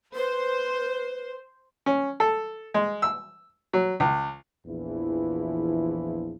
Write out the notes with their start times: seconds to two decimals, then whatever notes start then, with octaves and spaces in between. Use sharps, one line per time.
0.15 B4 C5
1.86 C#4
2.20 A4
2.74 G#3
3.02 E6
3.73 F#3
4.00 C#2
4.66 A#1 E2 E3 F3 E4